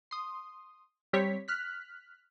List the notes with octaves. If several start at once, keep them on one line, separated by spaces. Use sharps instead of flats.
C6 D#6
G3 C4 G4 C#5 B6
F6 F#6 B6